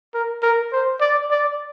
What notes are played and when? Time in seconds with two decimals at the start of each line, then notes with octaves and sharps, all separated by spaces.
0.14 A#4
0.43 A#4
0.73 C5
1.01 D5
1.31 D5